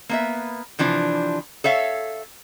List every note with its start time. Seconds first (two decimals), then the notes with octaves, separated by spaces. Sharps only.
0.09 A#3 B3 E5
0.79 C3 E3 F3 D4
1.64 A4 C#5 E5 F5